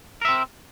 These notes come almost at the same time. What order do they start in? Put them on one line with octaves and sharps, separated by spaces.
A#4 E5 C4